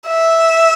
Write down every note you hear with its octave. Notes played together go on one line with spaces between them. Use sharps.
E5